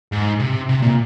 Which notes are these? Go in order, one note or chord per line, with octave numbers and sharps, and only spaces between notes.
G#2
C3
C3
A#2